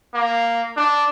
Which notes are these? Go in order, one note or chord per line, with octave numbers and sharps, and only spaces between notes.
A#3
D4